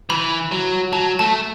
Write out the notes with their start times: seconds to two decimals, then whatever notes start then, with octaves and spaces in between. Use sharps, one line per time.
0.10 E3 B5
0.51 F#3
0.92 F#3 A5
1.19 A3 A5